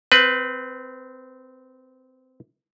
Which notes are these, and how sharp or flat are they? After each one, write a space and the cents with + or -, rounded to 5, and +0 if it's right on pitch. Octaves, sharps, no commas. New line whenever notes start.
C4 -20 B4 +0